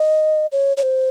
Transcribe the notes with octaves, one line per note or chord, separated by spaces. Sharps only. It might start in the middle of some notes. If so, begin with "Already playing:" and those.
Already playing: D#5
C#5
C#5
C5